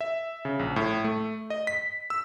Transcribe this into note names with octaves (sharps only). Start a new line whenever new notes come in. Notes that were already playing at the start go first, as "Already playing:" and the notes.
E5
C#3
A#1
A2
A3
D#5
B6
E6